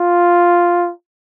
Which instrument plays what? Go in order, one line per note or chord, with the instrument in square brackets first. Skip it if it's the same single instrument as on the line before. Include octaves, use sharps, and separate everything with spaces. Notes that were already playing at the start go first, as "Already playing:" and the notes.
Already playing: [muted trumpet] F4